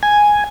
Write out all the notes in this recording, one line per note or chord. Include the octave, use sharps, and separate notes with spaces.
G#5